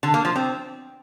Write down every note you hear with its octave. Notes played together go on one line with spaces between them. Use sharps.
D3
A#3
F3
C4